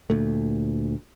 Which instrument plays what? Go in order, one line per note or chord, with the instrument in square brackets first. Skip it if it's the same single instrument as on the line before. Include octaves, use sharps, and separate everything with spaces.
[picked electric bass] D2 A#2 A3